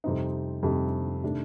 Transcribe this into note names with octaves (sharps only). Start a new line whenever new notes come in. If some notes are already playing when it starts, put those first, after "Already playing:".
F2 C3 G3 C4 D#4
F2 C3 G3 C4 D#4
C3 D#3 A3 D4